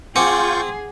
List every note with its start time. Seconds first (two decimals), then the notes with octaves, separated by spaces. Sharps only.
0.16 C4 F4 G#4 F#5 G#5 C#6 D6 G6